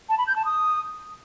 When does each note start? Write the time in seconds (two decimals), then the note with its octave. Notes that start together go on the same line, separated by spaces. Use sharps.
0.09 A5
0.18 B5
0.27 G6
0.36 A5
0.45 D#6